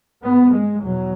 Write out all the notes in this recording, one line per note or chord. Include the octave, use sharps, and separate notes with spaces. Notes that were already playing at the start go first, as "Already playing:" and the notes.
G#2 B3
G#3
E2 B2 F#3